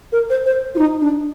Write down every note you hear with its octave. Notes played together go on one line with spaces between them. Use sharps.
A#4
C5
C5
F4
D#4
D4